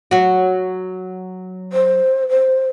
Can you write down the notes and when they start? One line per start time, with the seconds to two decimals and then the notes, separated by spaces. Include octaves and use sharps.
0.11 F#3 F#4
1.73 C5
2.29 C5